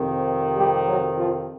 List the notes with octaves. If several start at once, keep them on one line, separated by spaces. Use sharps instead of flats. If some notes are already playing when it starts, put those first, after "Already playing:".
Already playing: F2 C3 D#3
G3 G4
F#3 F#4
F3 F4